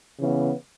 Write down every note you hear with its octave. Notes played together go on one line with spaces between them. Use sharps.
C#3 E3 B3